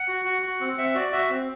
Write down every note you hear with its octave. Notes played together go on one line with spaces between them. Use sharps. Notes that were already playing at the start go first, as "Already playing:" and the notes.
Already playing: F#5
F#4
F#4
F#4
C4
C4 E5
F#4 D5
F#4 E5
C4